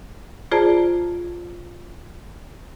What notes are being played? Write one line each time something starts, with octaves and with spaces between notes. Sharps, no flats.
F4 G#4 C5 D5 A5 A#5